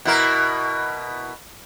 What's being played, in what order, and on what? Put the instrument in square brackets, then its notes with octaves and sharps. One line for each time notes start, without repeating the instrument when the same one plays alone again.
[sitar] B2 E4 A#4